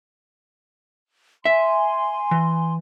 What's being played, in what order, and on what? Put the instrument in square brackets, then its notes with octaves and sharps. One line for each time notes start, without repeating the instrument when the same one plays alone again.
[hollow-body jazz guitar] E5 [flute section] G#5 C6
[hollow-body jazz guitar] E3